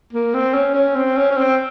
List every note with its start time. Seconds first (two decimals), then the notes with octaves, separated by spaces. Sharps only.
0.13 A#3
0.34 C4
0.54 C#4
0.75 C#4
0.96 C4
1.18 C#4
1.31 C#4
1.37 C4